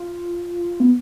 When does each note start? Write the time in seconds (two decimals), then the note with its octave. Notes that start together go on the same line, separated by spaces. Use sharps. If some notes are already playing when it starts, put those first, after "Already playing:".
Already playing: F4
0.80 B3